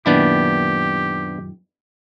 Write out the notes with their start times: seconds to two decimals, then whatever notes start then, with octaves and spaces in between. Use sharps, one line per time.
0.06 F#2 A#2 D#3 B3 D4 E4 G4